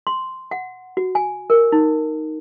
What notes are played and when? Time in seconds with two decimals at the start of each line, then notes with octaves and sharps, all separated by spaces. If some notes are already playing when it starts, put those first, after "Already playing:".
0.07 C6
0.51 F#5
0.97 F#4
1.15 G#5
1.50 A#4
1.72 D#4